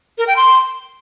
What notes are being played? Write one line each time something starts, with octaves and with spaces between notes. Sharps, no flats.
A#4
G5
C6